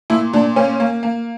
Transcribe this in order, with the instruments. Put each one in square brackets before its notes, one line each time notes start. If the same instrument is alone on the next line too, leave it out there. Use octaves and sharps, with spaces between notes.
[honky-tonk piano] A#2 E4
A#2 D4
A#3 C#4
A#3
A#3